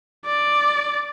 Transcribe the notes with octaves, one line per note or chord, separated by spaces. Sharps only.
D5